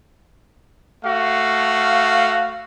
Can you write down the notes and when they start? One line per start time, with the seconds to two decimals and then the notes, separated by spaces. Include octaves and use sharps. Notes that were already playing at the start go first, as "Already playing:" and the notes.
1.04 A3 F#4 F5